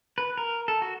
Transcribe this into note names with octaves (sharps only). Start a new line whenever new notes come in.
B4
A#4
A4
F#4